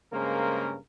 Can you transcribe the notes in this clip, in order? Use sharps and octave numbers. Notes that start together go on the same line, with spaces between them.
G2 C#3 G#3 A#3 A#4 C5